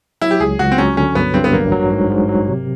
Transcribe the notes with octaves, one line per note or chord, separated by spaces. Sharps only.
F#3 E4
G4
C#2 G#4
C#2 F#4
C4
F#3 C#4
D3 C#4
G2 B3
G2 C4
B3
A1 A#3
F#3
G#2
G#2
F#3
C3